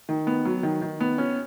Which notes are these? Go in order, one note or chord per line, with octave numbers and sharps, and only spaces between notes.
D#3
B3
F#3
D#3
D#3
B3
C#4